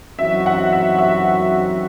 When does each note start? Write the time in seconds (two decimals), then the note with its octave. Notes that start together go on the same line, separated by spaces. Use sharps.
0.19 F#2 E3 C4 D#4 F#4 E5
0.46 F#5
0.73 E5
0.98 E5